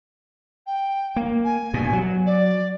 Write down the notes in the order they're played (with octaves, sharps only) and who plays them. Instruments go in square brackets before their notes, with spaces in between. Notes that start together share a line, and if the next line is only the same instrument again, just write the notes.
[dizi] G5
[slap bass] A#3
[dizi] G#5
[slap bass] G2 B2
F#3
[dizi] D5